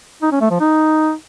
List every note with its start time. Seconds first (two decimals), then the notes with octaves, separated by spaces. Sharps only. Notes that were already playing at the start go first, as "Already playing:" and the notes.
0.22 D#4
0.32 C#4
0.41 A3
0.51 F3
0.60 D#4